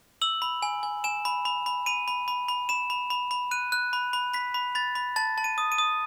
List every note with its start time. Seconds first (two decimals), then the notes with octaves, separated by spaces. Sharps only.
0.22 E6 F#7
0.42 B5
0.62 G#5
0.83 G#5
1.04 G#5 E7
1.25 B5
1.45 B5
1.66 B5
1.86 B5 D#7
2.08 B5
2.28 B5
2.48 B5
2.69 B5 E7
2.90 B5
3.10 B5
3.31 B5
3.51 F#6 D#7
3.72 F#6
3.93 B5
4.13 B5
4.34 B5 B6
4.54 B5
4.75 B5 A6
4.95 B5
5.16 A5 A6
5.38 A5
5.44 D#7
5.58 D#6
5.72 D#7
5.78 D#6